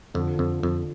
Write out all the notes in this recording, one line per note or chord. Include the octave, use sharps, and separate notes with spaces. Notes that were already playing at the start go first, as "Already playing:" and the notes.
F2 D3 F3
F2
F2